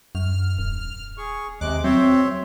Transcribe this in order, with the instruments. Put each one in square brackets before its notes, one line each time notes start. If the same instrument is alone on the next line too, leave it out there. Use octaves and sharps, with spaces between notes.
[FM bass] F#2 [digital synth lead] F6
[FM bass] D#1
[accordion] G#4 C#6
[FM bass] D#2 [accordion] C3 G#3 F#6 [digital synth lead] D6
[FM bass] F#3 [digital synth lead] C4 [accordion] C#5 E5 C6